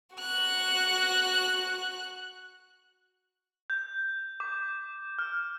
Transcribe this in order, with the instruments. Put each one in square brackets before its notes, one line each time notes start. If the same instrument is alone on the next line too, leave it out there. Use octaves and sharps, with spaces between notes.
[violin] F#4 F#6
[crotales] G6
D6
F6